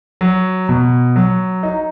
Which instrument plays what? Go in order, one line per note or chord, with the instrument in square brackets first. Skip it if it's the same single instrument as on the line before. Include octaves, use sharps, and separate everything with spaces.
[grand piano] F#3
B2
F#3
D#4